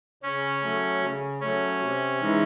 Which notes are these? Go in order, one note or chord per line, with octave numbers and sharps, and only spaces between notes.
C#3 C#4
F#3 A3
C#3
F#3 A3 C#4
C3
E3 G#3 D#4